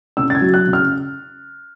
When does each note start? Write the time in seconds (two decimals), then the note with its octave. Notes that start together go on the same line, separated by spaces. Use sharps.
0.17 C#3 E6
0.30 A6
0.35 G#6
0.41 F#3
0.54 F#6
0.66 C#3
0.73 F6